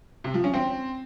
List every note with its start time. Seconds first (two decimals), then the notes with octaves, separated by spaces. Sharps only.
0.24 C3
0.34 F3
0.44 C#4
0.54 C4